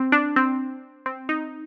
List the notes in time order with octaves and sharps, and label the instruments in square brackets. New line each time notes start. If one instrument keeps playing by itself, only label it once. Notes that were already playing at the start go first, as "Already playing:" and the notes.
Already playing: [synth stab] C4
D4
C4
C4
D#4